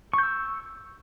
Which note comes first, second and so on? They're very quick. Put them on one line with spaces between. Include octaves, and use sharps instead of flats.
C#6 G6 E6